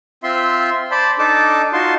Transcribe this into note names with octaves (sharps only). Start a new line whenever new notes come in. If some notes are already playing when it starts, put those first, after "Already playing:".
C4 F4 E5 C6
C5 D5 A5 B5
D4 D#4 A4 A5 D6
D#4 F4 F#4 A5 C6